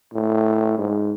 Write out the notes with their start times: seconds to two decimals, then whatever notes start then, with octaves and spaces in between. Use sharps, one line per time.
0.13 A2
0.78 G#2